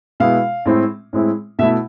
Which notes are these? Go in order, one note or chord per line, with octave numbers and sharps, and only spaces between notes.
B2 G#3 B3 E4 F5
A2 G#3 C4 E4
A2 G#3 C4 E4
B2 A3 E4 E5